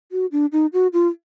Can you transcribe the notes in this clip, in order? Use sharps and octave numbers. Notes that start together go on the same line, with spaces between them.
F#4
D4
D#4
F#4
F4